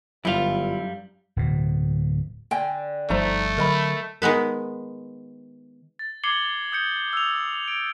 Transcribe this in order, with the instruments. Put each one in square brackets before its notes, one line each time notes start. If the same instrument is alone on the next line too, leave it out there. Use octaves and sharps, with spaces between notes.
[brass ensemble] G1 [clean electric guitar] F#2 G3 F5 [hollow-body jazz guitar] E4 F4
[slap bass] D1 B2
[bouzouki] D3 [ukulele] G5 G#5
[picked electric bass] G1 F3 G3 [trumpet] A3 [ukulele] D#4 C5 A#5
[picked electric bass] D3 F#3 [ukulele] A#4 D#5 B5
[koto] D#3 G#3 B3 B4
[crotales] A6
D6 G#6 C7 C#7 F#7 G7
D#6 G6 C#7
E6 F7
D7